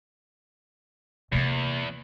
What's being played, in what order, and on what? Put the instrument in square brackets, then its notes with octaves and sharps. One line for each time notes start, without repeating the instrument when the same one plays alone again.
[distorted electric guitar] E2 [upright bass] C3 A#3